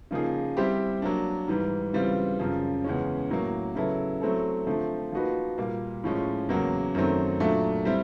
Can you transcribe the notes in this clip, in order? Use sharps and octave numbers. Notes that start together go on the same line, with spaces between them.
C#3 F3 A#3 D#4 G#4
G3 C4 E4 G4 C5
F#3 A#3 D4
G#2 E3 G3
C#3 E3 G3 C4 F4
F#2 C#3 F3
E2 C#3 E3 G#3 C#4
A2 F#3 A#3
C#3 F#3 B3 E4 A4
F#3 A3 C4 E4 A4
D3 F3 A3 C4
F3 A#3 D#4 F#4 B4
A#2 G3 A#3
A2 F3 G#3 C#4
E2 C#3 F#3 A#3
F#2 D#3 F#3 A3 C4
A#2 F#3 A3 D4
G3 C4 E4